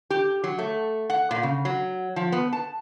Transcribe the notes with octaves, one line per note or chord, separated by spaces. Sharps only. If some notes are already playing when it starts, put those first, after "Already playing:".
G4
F#3
A3
F#5
A#2
C#3
F#3
F3
B3
A5